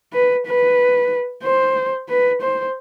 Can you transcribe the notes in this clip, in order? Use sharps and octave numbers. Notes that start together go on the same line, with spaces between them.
B4
B4
C5
B4
C5